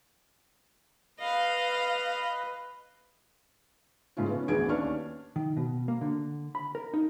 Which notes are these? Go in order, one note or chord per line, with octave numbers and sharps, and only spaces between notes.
B4 D#5 F5
G#2 C#3 A3 C#4 F4
B3 C#4
A1 D2 B3 G#4 G#6 D7
D#2 C#4 D4 B4 C#6 F6
D#3
B2
A#3
D3
B5
A#4
D#4